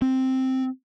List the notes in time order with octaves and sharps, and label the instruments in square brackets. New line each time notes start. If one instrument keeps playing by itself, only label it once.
[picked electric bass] C4